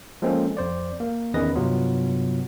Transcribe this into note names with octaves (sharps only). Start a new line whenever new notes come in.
F3 G#3 A#3 C4 C#4 A4
F2 C5 D5
A#3
E2 D#3 C#4 B4 D#5 A#6
G2 C3 F#3 B3 F4